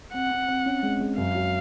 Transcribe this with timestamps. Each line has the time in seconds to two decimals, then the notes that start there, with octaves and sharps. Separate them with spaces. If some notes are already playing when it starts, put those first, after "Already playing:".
0.14 C4 F#5
0.31 C4
0.48 C4
0.66 C#4
0.83 G#3
1.00 G#3
1.17 F#2 F5
1.35 F#3